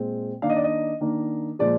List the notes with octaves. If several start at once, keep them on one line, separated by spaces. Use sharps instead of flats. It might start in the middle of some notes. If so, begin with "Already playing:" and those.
Already playing: A#2 G#3 C4
D#3 A#3 D4 F5
D#5
D5
D#5
D#3 A#3 D4
A#2 F3 G#3 D5